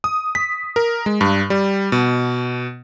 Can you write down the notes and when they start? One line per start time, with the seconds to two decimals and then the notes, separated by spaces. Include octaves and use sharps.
0.04 D#6
0.35 B6
0.76 A#4
1.06 G#3
1.21 G2
1.50 G3
1.92 B2